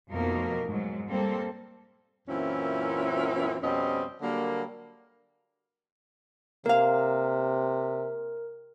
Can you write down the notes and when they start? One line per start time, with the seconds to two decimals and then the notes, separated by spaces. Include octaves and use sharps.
0.10 F2 B2 A3 A#3 D#4 A#4
0.68 G#2 F#3
1.09 G3 A#3 C4 A4
2.27 F#2 A#2 E3 C4 C#4 E4
3.62 F2 B2 G3 C4 C#4 D#5
4.21 D3 F#3 G3 A#3
6.66 C3 A#3 A#4 F5